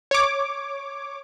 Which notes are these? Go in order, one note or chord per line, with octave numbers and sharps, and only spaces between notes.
C#5 D6